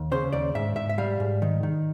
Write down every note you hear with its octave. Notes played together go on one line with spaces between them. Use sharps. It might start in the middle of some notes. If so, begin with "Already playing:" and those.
Already playing: D#2
C#3 C5
D#2 D5
G#2 E5
G#2 E5
E5
G3 F5
G#2
D#3
D#3